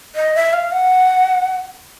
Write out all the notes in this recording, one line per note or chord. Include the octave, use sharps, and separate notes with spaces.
D#5
E5
F5
F#5